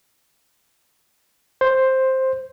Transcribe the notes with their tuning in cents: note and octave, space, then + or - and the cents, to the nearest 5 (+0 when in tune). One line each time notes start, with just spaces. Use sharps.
C5 +5